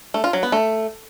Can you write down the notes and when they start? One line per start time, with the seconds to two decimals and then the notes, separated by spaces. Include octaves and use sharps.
0.14 A3
0.24 F4
0.33 F#3
0.43 B3
0.52 A3